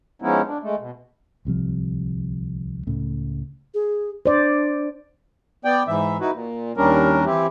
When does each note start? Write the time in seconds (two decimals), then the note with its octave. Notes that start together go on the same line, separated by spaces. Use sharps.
0.22 F3 G#3 B3 C#4 D#4 E4
0.47 D4
0.63 G#3 A3
0.79 B2
1.45 D1 C2 C3 F3
2.87 C#2 A2 C#3 A3
3.74 G#4
4.26 D4 C5 D5
5.65 B3 D5 G5
5.88 G#2 E3 E5
6.21 D#4 E4 F#4 B4
6.32 A#2
6.77 D#2 G3 C#4 D4 A#4
7.25 E3 C4 E4 G4